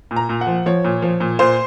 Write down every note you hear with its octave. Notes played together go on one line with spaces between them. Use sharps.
A#2
A#5
A#2
F#5
F3
F3 C#5
A#2
F3
A#2
A#2 C5